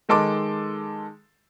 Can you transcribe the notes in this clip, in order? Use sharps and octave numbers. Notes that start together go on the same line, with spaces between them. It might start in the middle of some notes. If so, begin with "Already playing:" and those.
D#3 G#3 A4 C6 D6